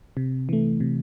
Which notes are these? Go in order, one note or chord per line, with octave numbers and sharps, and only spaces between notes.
C3
E3 A3
C3